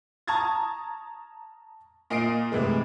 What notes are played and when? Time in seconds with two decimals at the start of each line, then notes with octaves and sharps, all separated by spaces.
0.28 A5 A#5 C#6 D#6 G#6 A6
2.10 A#2 D#5 C7 D7
2.52 A2 C3 E3 G#3